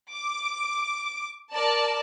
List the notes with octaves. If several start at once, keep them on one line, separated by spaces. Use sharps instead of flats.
D6
A#4 D5 A5